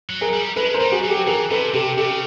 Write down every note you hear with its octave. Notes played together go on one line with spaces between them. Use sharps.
F#3
G#4 A#4
G3
G#3 A4 B4
A#4 C5
G3
F#4 G#4
F#3
G4 A4
E3 G#4 A#4
C3 A4 B4
C3 G4 A4
C#3 G4 A4